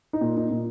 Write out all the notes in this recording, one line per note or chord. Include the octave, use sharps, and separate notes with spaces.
D#4
A#2
D#4
A#2